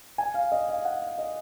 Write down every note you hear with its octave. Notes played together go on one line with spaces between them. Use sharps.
G#5
F5
D#5
F5
F#5
F5
D#5